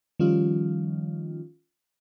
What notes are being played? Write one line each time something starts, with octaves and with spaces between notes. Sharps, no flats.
D#3 F3 G3 C#4 D#4 F4